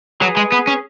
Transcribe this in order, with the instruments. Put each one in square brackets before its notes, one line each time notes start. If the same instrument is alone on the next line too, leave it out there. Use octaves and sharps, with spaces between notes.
[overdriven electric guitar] F#3 [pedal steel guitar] G#4 B4
[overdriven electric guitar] G#3
B3
C#4